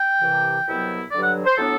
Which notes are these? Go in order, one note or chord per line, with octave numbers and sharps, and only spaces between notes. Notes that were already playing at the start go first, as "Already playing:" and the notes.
Already playing: G5
C2 C3 E3
C2 B2 F#3 B3 E4
G2 D3 F#3 D5
F#5
C5
A2 F#3 B3 D4 A4